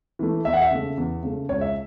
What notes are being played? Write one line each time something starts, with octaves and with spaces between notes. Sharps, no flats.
E3 A3
E2 E5
F#5
E5
C#3 A3
E2
C#3 A3
C#2 C#5
E5